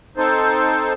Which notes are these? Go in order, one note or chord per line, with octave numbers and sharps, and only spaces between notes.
C4 D#4 A4 C5